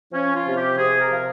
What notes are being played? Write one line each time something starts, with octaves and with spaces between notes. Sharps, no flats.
F3 C#4
F4
C3
G4
C3 G#4
A#4
F3